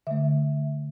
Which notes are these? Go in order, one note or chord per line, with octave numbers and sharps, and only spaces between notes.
D3 A3 E5